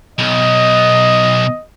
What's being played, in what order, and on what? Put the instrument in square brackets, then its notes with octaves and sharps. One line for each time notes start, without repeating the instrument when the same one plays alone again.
[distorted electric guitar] B1 [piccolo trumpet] D#5